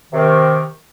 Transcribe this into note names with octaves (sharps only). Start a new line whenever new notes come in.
C3 D#3